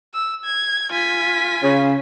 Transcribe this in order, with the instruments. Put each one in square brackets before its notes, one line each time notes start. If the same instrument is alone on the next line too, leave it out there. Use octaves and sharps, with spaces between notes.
[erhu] E6
G#6
[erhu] F4 [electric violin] G#5 B6
[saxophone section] C#3